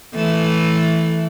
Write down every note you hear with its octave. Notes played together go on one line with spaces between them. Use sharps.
E3 A3